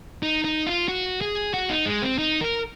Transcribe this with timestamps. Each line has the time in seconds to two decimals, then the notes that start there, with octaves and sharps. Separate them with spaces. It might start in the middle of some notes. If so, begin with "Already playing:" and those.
0.23 D#4
0.44 D#4
0.67 F4
0.88 F#4
1.21 G#4
1.54 F#4
1.70 D#4
1.86 G#3
2.02 C4
2.18 D#4
2.41 A#4